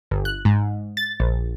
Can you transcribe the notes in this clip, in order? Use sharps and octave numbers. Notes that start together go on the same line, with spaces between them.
G1
F#6
G#2
A6
A#1